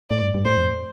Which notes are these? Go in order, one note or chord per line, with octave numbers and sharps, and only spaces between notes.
A2 D5
G2
G2
A2 C5
F2